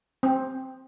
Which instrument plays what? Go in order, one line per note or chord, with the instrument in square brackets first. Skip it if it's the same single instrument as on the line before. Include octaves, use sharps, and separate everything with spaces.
[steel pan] C4